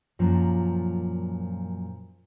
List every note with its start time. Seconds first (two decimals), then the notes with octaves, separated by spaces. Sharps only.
0.19 F#2 A#2 F3